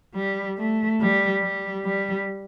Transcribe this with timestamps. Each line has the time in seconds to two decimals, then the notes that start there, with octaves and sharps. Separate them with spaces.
0.15 G3
0.58 A3
1.00 G3
1.42 G3
1.84 G3